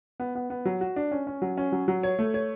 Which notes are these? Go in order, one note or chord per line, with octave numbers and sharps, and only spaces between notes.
B3
B3
B3
F#3
F#4
D4
C#4
C#4
F#3
C#4
F#3
F#3
C#5
A3
C#5